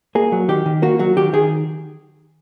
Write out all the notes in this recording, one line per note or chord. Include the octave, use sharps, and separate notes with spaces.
A#3 G#4
F#3
D#3 G4
D#3
A#3 F#4
F#3 F#4
D#3 G4
D#3 G#4